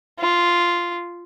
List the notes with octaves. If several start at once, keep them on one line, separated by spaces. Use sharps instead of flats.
F4